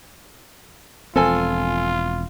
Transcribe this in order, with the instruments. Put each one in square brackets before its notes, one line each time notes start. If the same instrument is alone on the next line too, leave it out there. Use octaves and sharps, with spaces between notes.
[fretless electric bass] E1 F3 C4 [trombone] F4 [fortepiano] A4 G#5